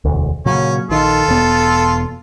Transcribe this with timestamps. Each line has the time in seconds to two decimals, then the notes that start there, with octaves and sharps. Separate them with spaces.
0.05 E1 D2
0.46 A#2 C#3 F#3 C#4
0.90 A#1 D#3 F4 A4
1.28 E1 B3